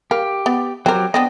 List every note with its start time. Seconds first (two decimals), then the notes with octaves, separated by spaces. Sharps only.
0.11 G4 A#4 F5
0.46 B3
0.86 F#3 C4 G4 A#4
1.14 B3 C4 D4 D#5